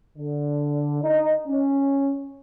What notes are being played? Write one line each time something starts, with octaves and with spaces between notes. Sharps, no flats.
D3
D#4
C#4